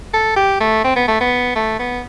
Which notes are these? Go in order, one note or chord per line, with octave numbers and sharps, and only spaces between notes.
A4
G4
A3
C4
B3
A3
B3
A3
B3